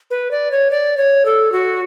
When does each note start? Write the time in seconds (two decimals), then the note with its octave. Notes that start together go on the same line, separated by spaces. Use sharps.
0.10 B4
0.31 D5
0.51 C#5
0.71 D5
0.97 C#5
1.25 A4
1.52 F#4